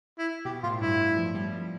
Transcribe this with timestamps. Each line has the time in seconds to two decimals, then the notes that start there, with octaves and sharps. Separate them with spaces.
0.19 E4
0.45 B2 G4
0.63 A2 F4
0.81 G2 E4
1.17 F3
1.35 G3
1.52 F3